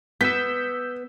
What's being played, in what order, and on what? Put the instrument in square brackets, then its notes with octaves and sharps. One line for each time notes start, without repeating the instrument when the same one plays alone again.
[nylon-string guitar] B3 [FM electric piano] E6 G6 [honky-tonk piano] B6